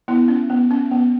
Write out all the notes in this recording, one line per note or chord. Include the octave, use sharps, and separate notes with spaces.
B3 E4
C#4
B3
C#4
B3